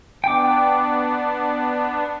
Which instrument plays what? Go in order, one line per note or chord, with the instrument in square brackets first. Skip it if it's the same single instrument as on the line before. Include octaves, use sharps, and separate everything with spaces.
[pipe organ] B3 D4 [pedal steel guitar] G5 D6